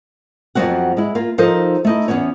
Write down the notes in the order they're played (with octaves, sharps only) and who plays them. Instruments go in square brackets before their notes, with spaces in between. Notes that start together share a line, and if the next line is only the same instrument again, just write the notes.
[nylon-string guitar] F2 F3 F#3 C4 F#4 F#5
G#3 E4
A#3 F4
F3 D#4 A4 A#4 C5
A3 D#4 E4
E2 F3 B3 C#4 C#5